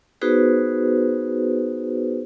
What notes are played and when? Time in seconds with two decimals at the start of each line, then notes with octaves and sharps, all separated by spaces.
0.22 B3 D#4 F#4 G#4 B4 C5